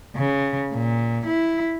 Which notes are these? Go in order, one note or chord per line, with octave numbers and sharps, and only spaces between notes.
C#3
A#2
E4